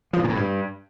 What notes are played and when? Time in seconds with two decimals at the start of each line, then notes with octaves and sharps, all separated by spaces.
0.13 F3
0.19 G#2
0.24 A#2
0.29 A2
0.35 G2